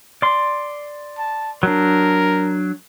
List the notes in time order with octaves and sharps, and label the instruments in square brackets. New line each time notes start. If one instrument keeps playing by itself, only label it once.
[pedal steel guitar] D5 C6
[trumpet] A5
[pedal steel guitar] F#3 D4 [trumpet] A#4